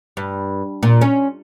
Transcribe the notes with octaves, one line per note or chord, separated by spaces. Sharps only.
G2
A#2
C#4